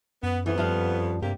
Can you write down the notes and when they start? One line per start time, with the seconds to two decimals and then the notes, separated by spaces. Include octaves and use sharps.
0.23 F#2 B3
0.46 F2 E3 B3
0.58 F3 G3 F5
1.22 G2 C3 G3 A#3 G4